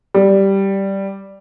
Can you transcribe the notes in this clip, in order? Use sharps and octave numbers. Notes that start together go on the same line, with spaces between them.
G3